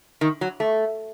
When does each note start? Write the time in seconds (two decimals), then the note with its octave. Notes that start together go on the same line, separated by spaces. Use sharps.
0.21 D#3
0.41 F#3
0.60 A3